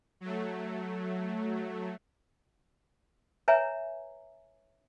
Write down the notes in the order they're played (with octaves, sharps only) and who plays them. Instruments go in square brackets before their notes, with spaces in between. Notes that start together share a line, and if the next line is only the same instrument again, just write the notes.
[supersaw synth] F#3 A3
[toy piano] B4 C#5 E5 G#5 A#5